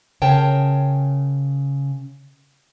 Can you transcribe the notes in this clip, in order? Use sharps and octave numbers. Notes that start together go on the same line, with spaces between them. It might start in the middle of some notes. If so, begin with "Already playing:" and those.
C#3 A#4 C#5 G5 A5